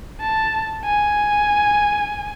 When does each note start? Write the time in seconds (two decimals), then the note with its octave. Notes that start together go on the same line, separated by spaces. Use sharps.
0.21 A5
0.84 G#5